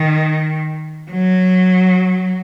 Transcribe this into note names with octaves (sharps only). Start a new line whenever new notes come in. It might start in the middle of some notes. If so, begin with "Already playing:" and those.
Already playing: D#3
F#3